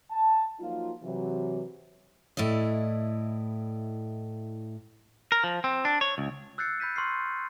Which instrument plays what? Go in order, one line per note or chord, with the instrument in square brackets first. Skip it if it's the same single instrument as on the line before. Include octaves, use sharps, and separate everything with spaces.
[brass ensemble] A5
F3 F#3 A#3 D#4 F4
C3 E3 F#3
[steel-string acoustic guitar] A2 E4 D5 D#5
[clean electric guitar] A#4
F3
C4
D4
C#5
C#2
[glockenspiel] E6 F#6 G6 A6 C7 C#7
B5 G6 B6 D#7
C6 C#6 E6 F6 C7